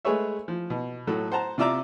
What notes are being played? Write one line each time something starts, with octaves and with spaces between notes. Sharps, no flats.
G#3 A3 G#4 B4 C#5 E5
F3
B2
A2 F#3 A4
C5 F#5 A5 A#5
C3 F4 D5 E5 A#5 D6